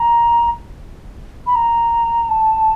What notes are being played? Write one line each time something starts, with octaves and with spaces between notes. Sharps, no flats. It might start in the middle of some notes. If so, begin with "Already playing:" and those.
Already playing: A#5
B5
A#5
A5